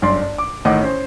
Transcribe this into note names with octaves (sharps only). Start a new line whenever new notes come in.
G1 F#2 D5 C6
D4
D6
A1 A2 D#3 D#5 F#5 D6
C#4 C5